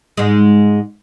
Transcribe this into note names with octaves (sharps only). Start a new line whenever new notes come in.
G#2 G#3